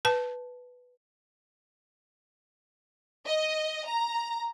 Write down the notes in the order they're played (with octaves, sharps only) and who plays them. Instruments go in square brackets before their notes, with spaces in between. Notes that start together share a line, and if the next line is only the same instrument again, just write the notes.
[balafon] B4 A5
[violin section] D#5
A#5